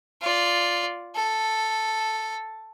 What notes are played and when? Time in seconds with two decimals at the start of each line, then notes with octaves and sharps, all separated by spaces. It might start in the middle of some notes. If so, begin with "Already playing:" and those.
0.22 F4 D5
1.16 A4